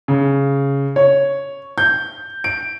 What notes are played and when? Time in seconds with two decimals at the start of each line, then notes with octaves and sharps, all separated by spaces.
0.08 C#3
0.96 C#5
1.78 G6
2.44 D7